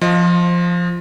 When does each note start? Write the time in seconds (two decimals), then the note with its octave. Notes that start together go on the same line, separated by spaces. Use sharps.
0.01 F3 D#5